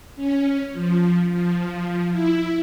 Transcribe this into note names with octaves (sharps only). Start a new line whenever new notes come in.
C#4
F3
F3
E4